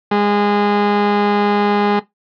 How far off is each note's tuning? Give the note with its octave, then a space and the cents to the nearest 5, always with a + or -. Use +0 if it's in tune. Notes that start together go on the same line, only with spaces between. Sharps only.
G#3 -20